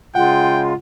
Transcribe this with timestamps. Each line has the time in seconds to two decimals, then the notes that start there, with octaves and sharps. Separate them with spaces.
0.15 C#3 G#3 F4 F#5 G5